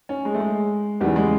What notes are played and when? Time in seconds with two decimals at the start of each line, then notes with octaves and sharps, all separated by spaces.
0.09 C#4
0.25 G#3
0.34 A3
0.40 G#3
1.01 E2 C#3 E3 G3
1.16 G#3